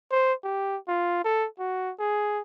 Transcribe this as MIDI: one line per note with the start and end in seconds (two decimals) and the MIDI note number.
0.11 0.33 72
0.44 0.77 67
0.88 1.22 65
1.24 1.47 69
1.59 1.92 66
2.00 2.41 68